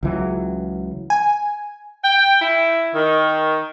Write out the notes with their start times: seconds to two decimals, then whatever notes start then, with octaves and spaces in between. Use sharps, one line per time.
0.03 C#2 E3 F#3
1.10 G#5
2.03 G5
2.40 E4
2.94 D#3